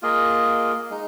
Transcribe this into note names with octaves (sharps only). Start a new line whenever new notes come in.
A#3 F4 G#4 D#5
G#3 D#4